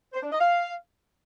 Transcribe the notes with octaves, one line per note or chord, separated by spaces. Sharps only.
C5
D4
D#5
F5